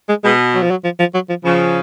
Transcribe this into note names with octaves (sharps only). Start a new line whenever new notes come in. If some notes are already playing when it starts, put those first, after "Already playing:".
G#3
B2 G#3
F#3
F3
F#3
F3
F3
F#3
F3
C#3 F3